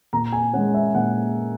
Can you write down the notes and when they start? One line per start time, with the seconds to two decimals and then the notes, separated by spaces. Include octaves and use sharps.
0.13 A#2 A#5
0.32 G#5
0.53 C#4 F#5
0.57 G#3
0.74 E5
0.95 A#2 F#5